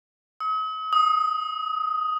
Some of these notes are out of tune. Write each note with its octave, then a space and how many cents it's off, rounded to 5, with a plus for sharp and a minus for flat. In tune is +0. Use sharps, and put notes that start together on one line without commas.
D#6 +45
D#6 +5